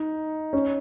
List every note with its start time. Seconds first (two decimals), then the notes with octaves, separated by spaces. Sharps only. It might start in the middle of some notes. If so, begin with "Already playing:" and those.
Already playing: D#4
0.53 C#4